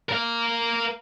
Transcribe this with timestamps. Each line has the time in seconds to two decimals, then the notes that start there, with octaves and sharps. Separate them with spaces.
0.09 A#4 F5